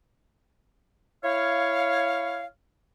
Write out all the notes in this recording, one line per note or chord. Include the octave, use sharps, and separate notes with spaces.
E4 C#5 F5